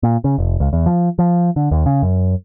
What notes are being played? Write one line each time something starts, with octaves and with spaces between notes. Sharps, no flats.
A#2
C#3
F1
C#2
E2
F3
F3
D3
D#2
C#3
F#2